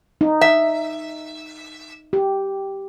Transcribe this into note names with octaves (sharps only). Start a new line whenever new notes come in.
D#4
E5
G4